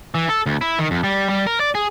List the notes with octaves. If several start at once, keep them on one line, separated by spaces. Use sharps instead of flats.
E3
A4
D2
E4
D#3
F2
G3
G3
A#4
D5
G#4